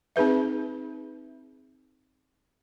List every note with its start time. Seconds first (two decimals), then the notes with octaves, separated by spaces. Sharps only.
0.16 C4 D#4 G#4 B4 E5